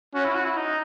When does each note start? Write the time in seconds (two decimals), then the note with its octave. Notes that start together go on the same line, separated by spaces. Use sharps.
0.14 C#4 F#4
0.24 E4
0.35 F#4
0.45 E4
0.56 D#4